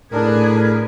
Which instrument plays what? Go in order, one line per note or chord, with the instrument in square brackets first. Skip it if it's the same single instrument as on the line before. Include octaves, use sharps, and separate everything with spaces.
[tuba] A2 [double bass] D4 [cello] G#4 B4 [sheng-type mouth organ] A#4